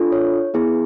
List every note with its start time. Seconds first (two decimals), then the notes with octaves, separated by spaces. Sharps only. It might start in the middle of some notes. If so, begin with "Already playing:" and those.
Already playing: D4 F4 A4
0.12 C#5
0.54 B3 E4 G#4